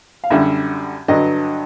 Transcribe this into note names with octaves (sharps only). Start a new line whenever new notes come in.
F5
F#2 D3 G3 E5
G2 D3 F#3 D#5